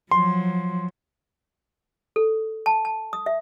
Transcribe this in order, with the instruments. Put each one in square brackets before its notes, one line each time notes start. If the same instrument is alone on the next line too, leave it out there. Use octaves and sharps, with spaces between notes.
[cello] F3 F#3 [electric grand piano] C6
[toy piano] A4
A5
A5
D#6
E5